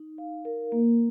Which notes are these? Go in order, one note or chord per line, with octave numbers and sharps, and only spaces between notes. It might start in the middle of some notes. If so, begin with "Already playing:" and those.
Already playing: D#4
F5
A#4
A#3